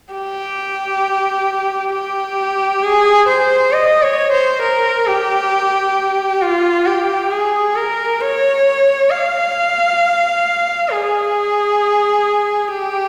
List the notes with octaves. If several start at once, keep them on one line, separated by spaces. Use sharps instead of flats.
G4
G4
G#4
C5
D#5
C#5
C5
A#4
G4
F4
G4
G#4
A#4
C#5
F5
G#4
G4